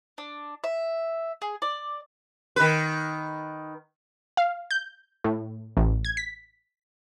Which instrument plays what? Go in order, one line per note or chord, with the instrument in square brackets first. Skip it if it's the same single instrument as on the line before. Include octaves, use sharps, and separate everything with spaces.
[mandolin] D4
E5
G#4
D5
[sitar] D#3 B4
[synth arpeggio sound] F5
G6
A2
A1
G#6
B6